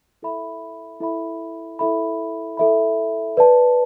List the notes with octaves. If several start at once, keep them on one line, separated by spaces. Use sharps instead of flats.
E4 A4 E5 B5
E4 A4 E5 B5
E4 A4 E5 B5
E4 A4 E5 B5
B4 D5 A5